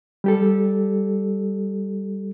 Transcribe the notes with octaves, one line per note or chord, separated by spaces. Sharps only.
G3 G4 A4